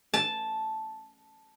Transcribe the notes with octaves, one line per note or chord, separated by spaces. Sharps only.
A5